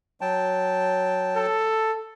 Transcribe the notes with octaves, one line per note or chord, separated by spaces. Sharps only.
F#3 G5 A5
A4